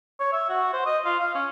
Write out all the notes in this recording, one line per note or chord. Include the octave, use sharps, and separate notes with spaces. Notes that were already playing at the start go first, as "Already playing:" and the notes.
C#5
E5
F#4
C5
D#5
F4
F5
C#4